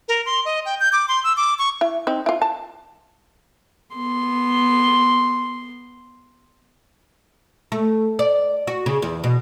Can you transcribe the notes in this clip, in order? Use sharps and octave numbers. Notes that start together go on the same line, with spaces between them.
A#4
C6
D#5
G5
G6
D6
C6
E6
D6
C#6
E4
C4 D#4
E4 F4
A5
B3 C6
A3
D5
F#4
C#3
E2
B2